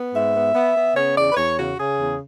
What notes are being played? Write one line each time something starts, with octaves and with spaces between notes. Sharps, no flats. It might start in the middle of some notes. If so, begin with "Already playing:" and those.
Already playing: B3
G#2 E5
B3
B3
B3
C#3 C#5
E2 D5
B4
E2 C#5
C#3 F#4
C#3 G#4
E2